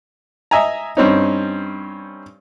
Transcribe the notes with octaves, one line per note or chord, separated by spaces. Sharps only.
D#5 E5 G#5 A#5
G2 C4 C#4 D#4